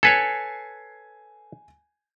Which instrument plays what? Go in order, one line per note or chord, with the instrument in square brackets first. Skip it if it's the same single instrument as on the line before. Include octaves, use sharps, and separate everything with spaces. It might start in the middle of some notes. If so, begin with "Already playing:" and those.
[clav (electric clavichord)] A4 B4 C#5 [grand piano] G#5 G#6 C7